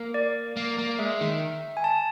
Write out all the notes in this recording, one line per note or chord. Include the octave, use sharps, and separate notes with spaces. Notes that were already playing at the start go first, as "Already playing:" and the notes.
Already playing: A#3
D5
A#3
A#3
G#3 E5
D#3
G#5
A5